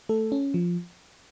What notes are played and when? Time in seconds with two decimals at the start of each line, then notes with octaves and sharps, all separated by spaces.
0.09 A3 A4
0.32 C#4
0.54 F3